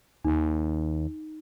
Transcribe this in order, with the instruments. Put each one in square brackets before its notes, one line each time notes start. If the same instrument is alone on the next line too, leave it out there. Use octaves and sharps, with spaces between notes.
[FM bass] D#2 [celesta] D#4